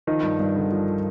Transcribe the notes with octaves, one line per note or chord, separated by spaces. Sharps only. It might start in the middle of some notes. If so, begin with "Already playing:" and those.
D#3 F3 D#4
G2
G2
D3
F3